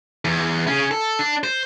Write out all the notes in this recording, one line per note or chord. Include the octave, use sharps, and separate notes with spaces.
E2
C#4 G#4
A4
D4
C5